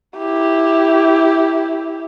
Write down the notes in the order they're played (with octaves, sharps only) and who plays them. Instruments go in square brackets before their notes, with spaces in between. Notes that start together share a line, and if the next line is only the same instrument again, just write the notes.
[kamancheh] E4 G4